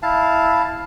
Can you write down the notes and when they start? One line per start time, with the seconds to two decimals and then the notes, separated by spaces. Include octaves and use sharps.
0.03 E4 F5 A5